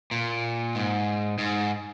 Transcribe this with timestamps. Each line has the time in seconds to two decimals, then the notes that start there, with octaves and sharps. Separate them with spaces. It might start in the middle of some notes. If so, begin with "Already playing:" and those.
0.11 A#2
0.75 G#2
1.38 G#2